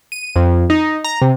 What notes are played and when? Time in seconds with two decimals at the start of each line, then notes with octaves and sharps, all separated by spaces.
0.12 D#7
0.36 F2
0.70 D#4
1.05 A#5
1.22 C3